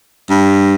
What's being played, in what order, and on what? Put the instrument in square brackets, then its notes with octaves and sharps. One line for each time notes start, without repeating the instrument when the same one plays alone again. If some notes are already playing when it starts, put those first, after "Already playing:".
[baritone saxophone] G2